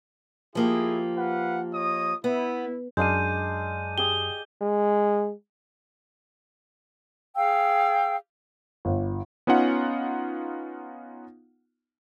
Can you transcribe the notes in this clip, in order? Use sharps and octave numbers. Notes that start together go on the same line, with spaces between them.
F3 A#3 E4 G4 G#4
B4 F5 F#5
C#5 D#5 D#6
B3 E4
F#2 G#3 D4 F5 G6 D#7
G4 G#4 D#6 G7
G#3
G#4 F5 G5 E6
G1
B3 C#4 D#4 F4 F#5